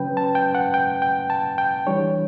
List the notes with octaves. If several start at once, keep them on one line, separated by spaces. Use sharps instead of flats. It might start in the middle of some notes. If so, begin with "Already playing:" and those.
Already playing: C#3 F#3 C#4 B4 G5
A5
G5
F#5
G5
G5
A5
G5
E3 G3 D4 C#5